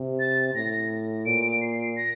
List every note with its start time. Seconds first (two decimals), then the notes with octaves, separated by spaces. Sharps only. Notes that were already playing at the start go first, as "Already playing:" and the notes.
Already playing: C3
0.20 A6
0.54 A2 A#6
1.26 A#2 D7
1.62 C7
1.97 A#6